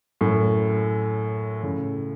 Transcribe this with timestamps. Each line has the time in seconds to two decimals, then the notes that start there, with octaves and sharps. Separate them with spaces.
0.21 F#2 A2
1.63 A2 C#3